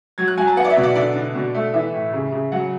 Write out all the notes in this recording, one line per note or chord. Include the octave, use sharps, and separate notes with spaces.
F#3 G#6
F#6
F#3 G#5
A5
B3 F#5
D5
E5
B2
D5
D3 D5
D3
B2
A3
E3 E5
A2
C#3
C#3
F#3 F#5